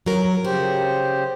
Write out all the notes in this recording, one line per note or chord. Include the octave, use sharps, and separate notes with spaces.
F#3 A#4
C#3 F#4 G4 C5